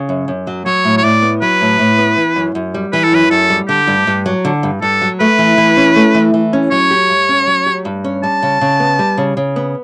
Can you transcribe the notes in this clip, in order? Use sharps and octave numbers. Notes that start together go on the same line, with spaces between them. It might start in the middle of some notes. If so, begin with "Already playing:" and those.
Already playing: C#3
F#2
F#2
F#3
F#3 C#5
A2
C#5
A2 D5
B3
F#3 B4
A2
A2
B3
E3
F#2
F#2
G3
E3 B4
A4
F#2 B4
F#2 A4
G3
D3 G4
G2
G2
F#3
D3
G2
G2 A4
F#3
A3 B4
E3
E3
C#4
A3
E3
E3
C#4
F#3 C#5
G4
G2
C#4
F#3
G4
G2
C#4
G3 A5
C#3
C#3
B3
G3
C#3
C#3
B3